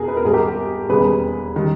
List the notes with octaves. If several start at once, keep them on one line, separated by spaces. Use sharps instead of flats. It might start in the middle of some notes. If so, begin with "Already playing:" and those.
Already playing: E1 E2 B2 G#4 A#4
B4
A#4
G#1 G2 G3 G#4
G4 A#4
E1 D#2 C#3 G3 G#4 B4
D#3 G3